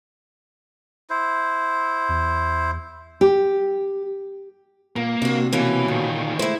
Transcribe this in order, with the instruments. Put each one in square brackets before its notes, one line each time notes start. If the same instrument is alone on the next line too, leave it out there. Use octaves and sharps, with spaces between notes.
[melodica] E4 C5
[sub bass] E2
[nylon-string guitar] G4
[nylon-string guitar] A#2 [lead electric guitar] A#3
[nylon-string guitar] C3 [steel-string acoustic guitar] D4 F#4
[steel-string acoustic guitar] B2 A#3 C#4 [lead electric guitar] E3
[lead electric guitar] D2 D#3 [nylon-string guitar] A#2
[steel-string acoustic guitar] G#3 A3 [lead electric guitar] E4 [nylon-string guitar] C5